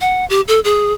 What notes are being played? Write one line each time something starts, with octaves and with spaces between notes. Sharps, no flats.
F#5
G4
A4
G#4